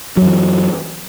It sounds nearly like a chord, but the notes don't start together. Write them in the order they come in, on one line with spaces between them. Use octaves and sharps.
F#3 F#2 E3